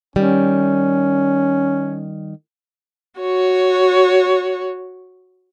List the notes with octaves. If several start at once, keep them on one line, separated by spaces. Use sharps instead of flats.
D#3 G3 C#4
F#4 C#5